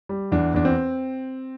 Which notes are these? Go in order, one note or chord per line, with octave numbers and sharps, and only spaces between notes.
G3
E2 D4
E2 D4
C4